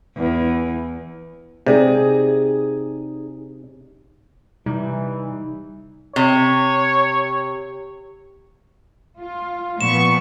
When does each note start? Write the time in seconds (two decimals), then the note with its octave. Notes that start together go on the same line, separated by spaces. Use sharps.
0.17 E2
1.67 C3 D#4 G#4 D5
4.66 C3 E3 G3 D#4
6.16 C3 C#5
9.18 F4
9.81 A#2 F3 B3 C#6 E7